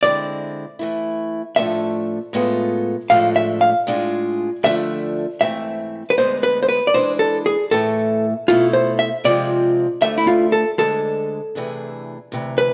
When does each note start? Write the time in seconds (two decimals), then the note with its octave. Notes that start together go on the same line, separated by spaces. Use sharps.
0.03 D3 G#3 C4 E4 D5
0.79 E3 A3 E4
1.56 A2 F3 A3 D4 A4 E5
2.33 A2 G#3 B3 F4 A4
3.10 A2 F3 G#3 D4 A4 F5
3.36 E5
3.61 F5
3.87 A2 G#3 D4 F4 G#4
4.64 F2 D3 F3 A3 D4 E5
5.41 G#2 E3 A3 C4 E5
6.10 B4
6.18 D2 D3 G#3 B3 C5
6.43 B4
6.63 C5
6.69 B4
6.87 D5
6.94 E3 G#3 D4 C5
7.19 A4
7.46 G#4
7.71 A2 E3 A3 A4
8.48 B2 A3 E4 F4 A4
8.73 C5
8.99 E5
9.24 C3 F3 G#3 C4 F4 D5
10.01 D2 D3 A3 E5
10.18 E4
10.27 F4
10.52 A4
10.78 D2 D3 G#3 A4
11.55 C3 E3 A3 D4 G#4
12.32 D2 C3 E3
12.58 B4